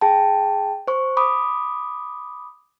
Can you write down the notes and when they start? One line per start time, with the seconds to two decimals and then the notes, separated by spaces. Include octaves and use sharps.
0.01 G#4 G5 A5
0.88 C5 C#6
1.17 B5 D6 D#6